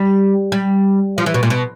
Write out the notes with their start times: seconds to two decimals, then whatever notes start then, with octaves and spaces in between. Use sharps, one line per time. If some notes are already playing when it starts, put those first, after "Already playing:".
Already playing: G3
0.52 G3
1.18 F3
1.26 E3
1.34 B2
1.43 A#2
1.50 B2